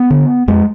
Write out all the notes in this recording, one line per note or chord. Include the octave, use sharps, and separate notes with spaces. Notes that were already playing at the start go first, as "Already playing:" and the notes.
Already playing: B3
D3
F2 G#3